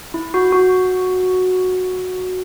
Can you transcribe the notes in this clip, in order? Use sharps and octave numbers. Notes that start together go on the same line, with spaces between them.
E4
F#4
F#4